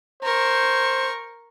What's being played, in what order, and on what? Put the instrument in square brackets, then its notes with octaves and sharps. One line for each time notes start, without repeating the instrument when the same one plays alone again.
[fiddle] A#4 C#6 [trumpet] C5